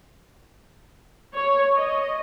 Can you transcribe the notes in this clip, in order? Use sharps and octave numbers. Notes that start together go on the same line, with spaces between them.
C#5
D#5